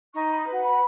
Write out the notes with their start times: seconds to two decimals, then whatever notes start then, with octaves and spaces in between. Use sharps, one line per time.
0.13 D#4 C#6
0.29 B5
0.46 F#4 B4
0.63 B5